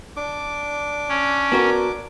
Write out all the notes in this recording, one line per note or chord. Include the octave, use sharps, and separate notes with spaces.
D4 D6
C#4
B3 F#4 A#4